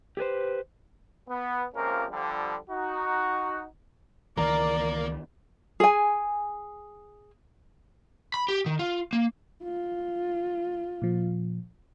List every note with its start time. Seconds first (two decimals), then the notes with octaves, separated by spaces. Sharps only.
0.17 G4 G#4 B4 C5
1.29 B3
1.75 C#2 C3 F3 A#3 C#4 A#4
2.11 D3 F3 G3
2.70 D#4 F#4
4.37 C#2 D#3 E3 A#3 D5 A#5
5.80 G#4 G#5
8.34 B5
8.48 G4
8.66 D#3
8.79 F4
9.13 A#3
9.64 F4
11.02 A#2 F3